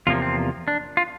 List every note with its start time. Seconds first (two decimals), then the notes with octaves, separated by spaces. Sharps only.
0.07 E2 C3 F3 A#3 F4
0.22 C4
0.68 D4
0.97 F4